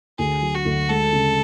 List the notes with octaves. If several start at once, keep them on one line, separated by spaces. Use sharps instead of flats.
D2 G#4
F#3
F#4
D2
G#3 A4
C#3